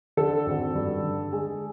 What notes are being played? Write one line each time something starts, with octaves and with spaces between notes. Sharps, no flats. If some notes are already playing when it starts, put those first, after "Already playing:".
D3 A4
G#1
G2
D3
G#3 G#4